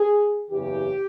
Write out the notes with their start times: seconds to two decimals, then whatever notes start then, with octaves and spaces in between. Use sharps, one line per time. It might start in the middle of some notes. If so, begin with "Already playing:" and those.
Already playing: G#4
0.51 F#1 E2 C#3 E3 G4